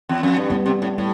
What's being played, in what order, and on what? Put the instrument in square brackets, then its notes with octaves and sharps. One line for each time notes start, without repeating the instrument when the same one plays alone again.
[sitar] E2
F2
G2
[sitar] A2 [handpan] G3 B3
[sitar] C3
A2
[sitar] A2 [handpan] G3